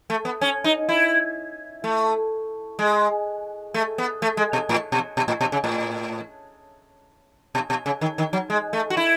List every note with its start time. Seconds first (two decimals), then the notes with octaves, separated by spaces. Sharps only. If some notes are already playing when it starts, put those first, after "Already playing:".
0.10 A3
0.25 B3
0.41 C#4
0.64 D#4
0.89 E4
1.84 A3
2.79 G#3
3.74 A3
3.98 B3
4.22 A3
4.37 G#3
4.53 B2
4.69 A2
4.92 B2
5.17 B2
5.28 A2
5.41 B2
5.52 C#3
5.64 A2
7.55 B2
7.70 B2
7.86 C#3
8.01 D#3
8.18 D#3
8.33 F#3
8.50 G#3
8.73 A3
8.90 F#4
8.97 E4